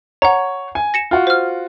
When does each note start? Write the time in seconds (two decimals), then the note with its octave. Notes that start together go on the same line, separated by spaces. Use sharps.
0.22 C#5 F#5 A#5
0.75 G#5
0.94 A#6 C#7 E7
1.11 F4 F#4
1.27 C5 F6